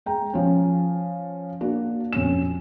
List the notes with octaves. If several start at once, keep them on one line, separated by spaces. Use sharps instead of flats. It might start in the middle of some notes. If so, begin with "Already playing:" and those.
G#3 G5 A#5
F3 C#4
A#3 D4 F#4
F2 C#4 E7